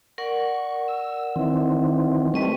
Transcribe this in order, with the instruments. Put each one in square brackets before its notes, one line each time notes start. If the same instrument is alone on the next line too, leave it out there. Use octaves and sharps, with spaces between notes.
[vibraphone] A#4 D5 F#5 [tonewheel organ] C#6
[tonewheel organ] E6
D#3 E3 C4
[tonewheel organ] G3 A3 C4 [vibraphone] B4 D#5 C#6